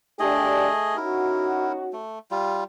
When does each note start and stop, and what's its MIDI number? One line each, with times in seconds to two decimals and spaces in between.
0.20 0.97 57
0.20 0.67 62
0.20 0.67 67
0.20 0.97 68
0.20 0.97 75
0.97 2.00 61
0.97 2.00 63
0.97 1.72 64
0.97 2.00 66
0.97 1.72 70
1.93 2.19 57
2.31 2.64 55
2.31 2.64 65